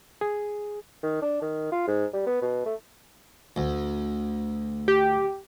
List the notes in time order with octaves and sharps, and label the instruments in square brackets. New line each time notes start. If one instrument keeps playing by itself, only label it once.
[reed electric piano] G#4
[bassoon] D#3
D4
D#3
F4
G#2
G3
B3
B2
A3
[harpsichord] D2
[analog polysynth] G4